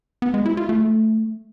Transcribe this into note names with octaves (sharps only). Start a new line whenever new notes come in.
B3
G#3
E4
F4
A3